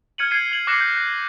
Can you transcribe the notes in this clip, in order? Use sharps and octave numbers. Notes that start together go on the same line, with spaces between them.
F6 G#6 C#7 D#7 F#7
G#6 C7 D#7
G#6 F#7
D6 F#6 A#6 C7 C#7 E7
G6
G6 A#6